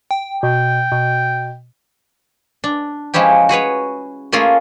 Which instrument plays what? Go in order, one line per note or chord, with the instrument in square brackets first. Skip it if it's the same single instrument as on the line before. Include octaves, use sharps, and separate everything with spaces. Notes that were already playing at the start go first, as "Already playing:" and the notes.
[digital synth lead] G5
[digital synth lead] B2 [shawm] G5
[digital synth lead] B2
[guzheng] D4
F3 G#3 C#4 E4 G4
F#4 G#4 B4 C#5
A3 A#3 C#4 F4 G#4 A#4